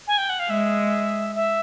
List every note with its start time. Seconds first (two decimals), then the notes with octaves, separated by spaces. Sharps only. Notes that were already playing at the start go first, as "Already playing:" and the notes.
0.08 G#5
0.18 G5
0.29 F#5
0.39 F5
0.50 G#3 E5
1.36 E5